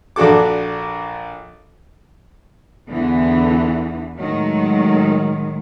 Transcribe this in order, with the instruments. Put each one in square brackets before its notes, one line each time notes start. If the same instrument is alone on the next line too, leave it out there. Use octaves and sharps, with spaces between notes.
[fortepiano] A#1 D4 F#4 A4 D6
[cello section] E2 D3 E3 B3
A2 D#3 F#3 G#3